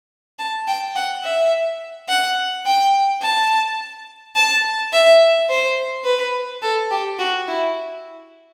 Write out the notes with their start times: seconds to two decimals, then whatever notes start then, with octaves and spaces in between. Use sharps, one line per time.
0.39 A5
0.67 G5
0.96 F#5
1.23 E5
2.09 F#5
2.66 G5
3.22 A5
4.35 A5
4.93 E5
5.49 C5
6.05 B4
6.62 A4
6.91 G4
7.19 F#4
7.48 E4